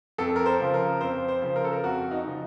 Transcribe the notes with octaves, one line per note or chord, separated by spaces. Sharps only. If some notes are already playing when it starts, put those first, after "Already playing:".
F2 A4
A#4
C5
C#3 F3
A#4
F2 C5
C5
C#3 F3
A#4
A4
A#4
F2 F#4
D#4
C#3 F3